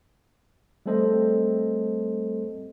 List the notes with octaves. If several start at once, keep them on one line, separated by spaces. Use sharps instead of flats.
G3 A3 C4 A4 C5 D#5